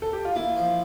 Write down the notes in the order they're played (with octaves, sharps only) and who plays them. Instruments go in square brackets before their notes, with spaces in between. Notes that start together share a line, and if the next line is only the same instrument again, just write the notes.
[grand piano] A4
G4
F4
[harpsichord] A#3 [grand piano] E4
[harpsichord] F3